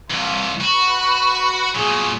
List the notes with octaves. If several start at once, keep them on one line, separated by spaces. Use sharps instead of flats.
C2 E3 F4
F#4 B4
A#2 F#3 G#4